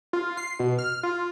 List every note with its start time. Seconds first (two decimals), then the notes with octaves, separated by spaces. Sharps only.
0.13 F4
0.37 C7
0.59 B2
0.79 F6
1.03 F4